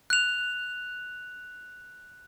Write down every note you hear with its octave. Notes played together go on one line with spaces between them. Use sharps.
F#6 F7